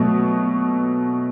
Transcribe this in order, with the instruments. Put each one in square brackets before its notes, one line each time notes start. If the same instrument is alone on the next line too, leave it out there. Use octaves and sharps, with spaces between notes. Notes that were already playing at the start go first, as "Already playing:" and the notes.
Already playing: [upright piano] B2 F#3 A3